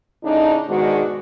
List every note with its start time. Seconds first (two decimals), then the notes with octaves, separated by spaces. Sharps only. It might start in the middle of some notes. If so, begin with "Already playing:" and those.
0.24 A2 C#3 D4 D#4
0.69 G#2 B2 D#3 G#3 D4 F#4